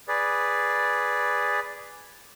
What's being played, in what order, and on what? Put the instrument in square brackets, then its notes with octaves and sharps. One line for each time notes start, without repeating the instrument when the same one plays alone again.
[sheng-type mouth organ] G#4 B4 D5